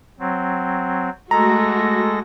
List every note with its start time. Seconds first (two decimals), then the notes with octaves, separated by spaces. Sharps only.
0.19 F#3 C4
1.31 G#3 A3 F#4 A4 A#5 A#6